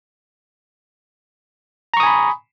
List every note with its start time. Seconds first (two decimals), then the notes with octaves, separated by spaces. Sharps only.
1.94 A#5
1.97 C#6
2.00 D#6
2.03 G#5
2.06 B5